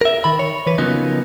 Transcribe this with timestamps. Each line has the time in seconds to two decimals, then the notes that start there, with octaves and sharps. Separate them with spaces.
0.01 A#4 E5
0.24 D#3 B5
0.39 C#5
0.67 E3 B4
0.78 C#3 F3 F#3 A#3 B3 D#4